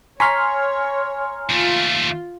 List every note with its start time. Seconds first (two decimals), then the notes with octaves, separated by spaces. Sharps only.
0.20 C#5 G#5 A#5 C6 C#6 F6 B6
1.50 D#2 A3 F4